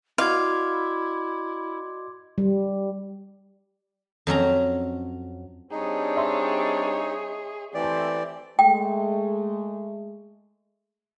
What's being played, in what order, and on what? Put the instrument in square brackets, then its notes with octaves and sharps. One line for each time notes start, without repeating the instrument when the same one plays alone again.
[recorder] E4 [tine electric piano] F#4 D5 D#5 [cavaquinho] F5 [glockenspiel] C6 D6 G#6
[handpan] G3
[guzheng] F2 F#3 C#4 A#5
[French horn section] G3 C4 D4 [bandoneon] D#4 [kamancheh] G#4 C#5
[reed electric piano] D#5 E5 C6
[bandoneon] E3 D5 [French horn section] A3 C4 [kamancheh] G4
[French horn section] G#3 A3 [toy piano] G5